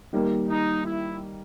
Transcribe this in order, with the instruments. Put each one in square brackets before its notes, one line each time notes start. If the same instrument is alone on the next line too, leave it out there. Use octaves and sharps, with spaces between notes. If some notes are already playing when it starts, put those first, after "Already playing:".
[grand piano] D#3 G3 A#3
[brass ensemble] D#4
E4